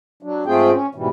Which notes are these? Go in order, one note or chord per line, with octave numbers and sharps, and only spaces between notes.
F#3 D4
G#2 A3 C4 F4 G#4 G5
C#4
G#2 B2 E3 G3